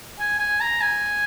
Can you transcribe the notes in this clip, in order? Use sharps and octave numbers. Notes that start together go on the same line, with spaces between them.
G#5
G#5
A#5
G#5